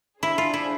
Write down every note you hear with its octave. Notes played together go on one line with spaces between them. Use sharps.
D4 E4 G#4 C5
F4
E4